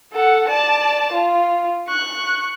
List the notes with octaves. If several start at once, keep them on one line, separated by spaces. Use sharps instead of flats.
A4 F#5
D5 A5
F4
C#6 F#6